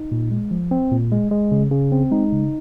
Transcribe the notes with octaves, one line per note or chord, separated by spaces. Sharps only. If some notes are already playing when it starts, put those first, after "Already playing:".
Already playing: D#4
A#2
G#3
F3
C4
A#2
G#3
G#3
C#3
C#3
C4
G#3 D#4
C#3